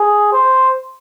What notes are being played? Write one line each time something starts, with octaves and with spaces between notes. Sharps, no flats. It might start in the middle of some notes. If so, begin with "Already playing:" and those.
Already playing: G#4
C5